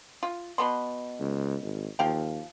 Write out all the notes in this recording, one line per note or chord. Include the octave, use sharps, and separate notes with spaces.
F4
B2 B3 C6
C#2
G#1
D#2 F3 F5 G5